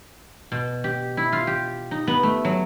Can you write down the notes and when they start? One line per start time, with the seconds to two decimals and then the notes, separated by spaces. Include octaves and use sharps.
0.52 B2
0.84 G4
1.17 E4
1.33 F4
1.47 G4
1.91 D#4
2.07 B3
2.23 A3
2.45 F#3